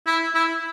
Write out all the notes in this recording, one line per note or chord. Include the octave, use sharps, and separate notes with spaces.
E4
E4